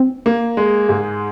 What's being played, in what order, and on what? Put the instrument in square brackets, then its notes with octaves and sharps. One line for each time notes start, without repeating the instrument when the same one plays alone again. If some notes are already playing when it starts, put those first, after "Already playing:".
Already playing: [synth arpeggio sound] C4
[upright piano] A#3
G#3
G#2